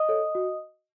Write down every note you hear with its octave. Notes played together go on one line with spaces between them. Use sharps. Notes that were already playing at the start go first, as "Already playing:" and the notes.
Already playing: D#5 D#6
A4 C#5
F#4